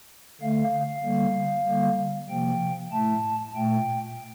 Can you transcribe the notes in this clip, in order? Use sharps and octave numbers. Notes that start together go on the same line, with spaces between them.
D3 A3 F5
F5
D3 G3 A#3
D3 G3 A#3
C3 F3 A#3 G5
A2 A3 A5
A#2 A3 G5